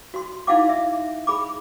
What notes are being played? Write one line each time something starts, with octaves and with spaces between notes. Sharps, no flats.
F#4 C6
D#4 E4 F5 F#5 D6
E5
G#4 B5 D6